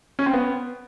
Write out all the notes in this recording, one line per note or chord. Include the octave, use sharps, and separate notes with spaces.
C#4
C4
B3